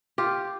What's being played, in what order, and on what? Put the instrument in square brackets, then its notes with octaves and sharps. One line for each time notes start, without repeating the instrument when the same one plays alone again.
[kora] F4 G4